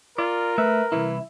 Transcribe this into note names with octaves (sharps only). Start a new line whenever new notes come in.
F4 A#4 D5
A3 B4 E5
C2 F2 E3 E4